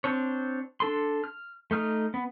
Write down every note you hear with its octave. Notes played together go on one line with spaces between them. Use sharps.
C4 D4 C#5
D4 A4 C6
F6
A3 D#4 F6
B3